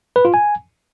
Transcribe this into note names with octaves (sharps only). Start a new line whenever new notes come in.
B4
F4
G#5